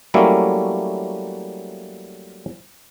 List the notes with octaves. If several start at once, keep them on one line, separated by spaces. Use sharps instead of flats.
F#3 G3 A3 A#3 C#4 E4